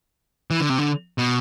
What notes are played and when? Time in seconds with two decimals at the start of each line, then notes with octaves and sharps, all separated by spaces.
0.51 E3
0.61 D3
0.70 C3
0.78 D3
1.18 B2